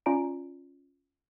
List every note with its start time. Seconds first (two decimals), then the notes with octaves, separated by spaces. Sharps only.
0.06 C#4 F4 D5 A#5 D7